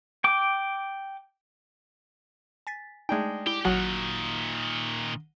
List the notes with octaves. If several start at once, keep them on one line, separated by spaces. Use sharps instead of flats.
G5 D6
G#5 A6 B6
G#3 A3 D4 D#4 G5
E4 G4
G#1 A#2 D#3 F#3 F#4 F#5